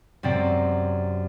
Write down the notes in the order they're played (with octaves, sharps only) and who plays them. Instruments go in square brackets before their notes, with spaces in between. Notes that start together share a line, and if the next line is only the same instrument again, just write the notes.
[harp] F#2 C3 C4 D5